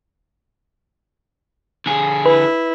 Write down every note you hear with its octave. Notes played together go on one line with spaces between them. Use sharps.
D3 G#4
E4 B4